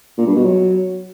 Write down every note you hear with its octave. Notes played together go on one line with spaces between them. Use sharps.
A#2
G2
B2
F#3